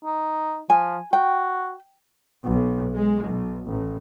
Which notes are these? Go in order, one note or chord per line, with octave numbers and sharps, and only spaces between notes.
D#4
F3 G#5
F#4 G5
B1
G#3
B1
A1